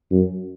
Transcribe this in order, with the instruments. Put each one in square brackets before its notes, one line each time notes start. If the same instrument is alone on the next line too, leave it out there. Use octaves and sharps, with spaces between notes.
[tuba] F#2